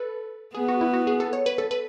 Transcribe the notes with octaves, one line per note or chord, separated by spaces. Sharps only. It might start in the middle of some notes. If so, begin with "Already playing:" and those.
Already playing: A4 B4
B3 G#4
F#4
E4
F#4
G#4
A4
C#5
B4
A4
B4